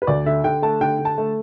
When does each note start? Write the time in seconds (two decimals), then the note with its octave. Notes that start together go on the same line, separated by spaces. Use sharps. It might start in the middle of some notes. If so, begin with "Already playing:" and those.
0.02 B4
0.07 D2 D5
0.26 D3 E5
0.44 D3 G5
0.62 A3 A5
0.81 D3 G5
0.99 D3
1.05 A5
1.18 A3